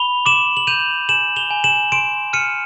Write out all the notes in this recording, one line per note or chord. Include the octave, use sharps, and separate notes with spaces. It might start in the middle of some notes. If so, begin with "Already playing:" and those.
Already playing: B5 F7 G7
D6 E7 F#7
F#7
G6 D#7 F7
G#5 E7 F#7
F7 G7
G#5
E7 F#7
C6 D7 E7
F6 C#7 D#7